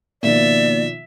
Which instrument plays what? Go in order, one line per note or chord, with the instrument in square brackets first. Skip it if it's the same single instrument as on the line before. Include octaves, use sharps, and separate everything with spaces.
[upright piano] B2 D#3 F3 [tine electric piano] A#3 [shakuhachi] D5 [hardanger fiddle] E5